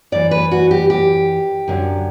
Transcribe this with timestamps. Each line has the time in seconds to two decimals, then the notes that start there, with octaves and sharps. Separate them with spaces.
0.12 F#2 E3 D5
0.31 B4
0.51 F#4
0.71 G4
0.90 G4
1.68 F#2 D3 F#3